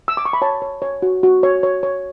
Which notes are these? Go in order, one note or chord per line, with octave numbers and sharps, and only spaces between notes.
E6
D6
C#6
B5
C#5 A5
C#5
C#5
F#4
F#4
C#5
C#5
C#5